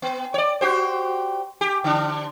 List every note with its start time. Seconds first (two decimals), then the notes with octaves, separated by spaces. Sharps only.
0.02 B3
0.34 C#5 D5
0.61 F#4 G4 C5
1.61 G4
1.84 D3 D4